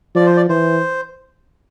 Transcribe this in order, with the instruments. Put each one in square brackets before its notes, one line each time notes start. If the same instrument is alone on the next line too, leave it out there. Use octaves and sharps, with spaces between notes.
[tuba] F3 [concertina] D5
[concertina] C5
D5
[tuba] E3 [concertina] C5